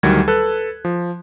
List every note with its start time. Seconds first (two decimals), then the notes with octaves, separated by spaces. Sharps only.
0.03 D2 D#3 F#3 G3 G#6
0.28 A4 B4 F#6
0.85 F3